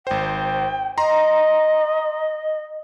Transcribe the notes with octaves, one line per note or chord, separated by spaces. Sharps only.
G#1 C5 G5
D#5 A#5 C6